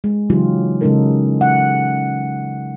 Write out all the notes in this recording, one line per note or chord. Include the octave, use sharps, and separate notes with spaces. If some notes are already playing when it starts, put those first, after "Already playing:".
G#3
C#3 E3 F#3 D#4 F4 G4
C#3 G#3 C#4 D#4 A4 A#4
F#5